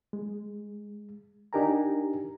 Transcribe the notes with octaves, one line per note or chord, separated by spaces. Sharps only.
G#3
D4 D#4 G4 A#4 G#5 A#5